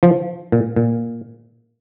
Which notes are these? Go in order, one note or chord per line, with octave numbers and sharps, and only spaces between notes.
F3
A#2
A#2